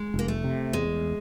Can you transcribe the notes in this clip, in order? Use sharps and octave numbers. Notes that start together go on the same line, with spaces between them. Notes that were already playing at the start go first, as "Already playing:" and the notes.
Already playing: G#3
F1 A#3
A3
C3
E2 G#3